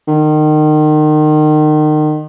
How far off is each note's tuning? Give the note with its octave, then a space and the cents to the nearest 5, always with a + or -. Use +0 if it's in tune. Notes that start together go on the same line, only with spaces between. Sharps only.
D#3 -30